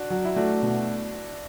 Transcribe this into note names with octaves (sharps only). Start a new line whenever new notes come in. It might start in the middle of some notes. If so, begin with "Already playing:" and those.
Already playing: D4 F#4
F#3
E4
A3 D4 F#4
B2